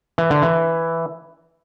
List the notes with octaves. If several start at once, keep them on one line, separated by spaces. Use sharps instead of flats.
E3
D3
E3